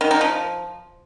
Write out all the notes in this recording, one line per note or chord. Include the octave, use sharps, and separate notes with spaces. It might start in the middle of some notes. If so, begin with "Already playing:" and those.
D#3
D#4
F3